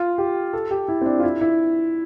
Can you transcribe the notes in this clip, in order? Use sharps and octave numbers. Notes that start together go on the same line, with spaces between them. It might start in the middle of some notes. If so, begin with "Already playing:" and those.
Already playing: F4
G4
A4
G4
E4
C4
D4
F4
E4
E4